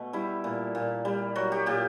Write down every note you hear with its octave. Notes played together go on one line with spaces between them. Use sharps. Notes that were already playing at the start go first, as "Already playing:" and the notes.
Already playing: B2 A3
G3 E4
A#2
A#2
G3
F#3 F#4
G4
A#2 G4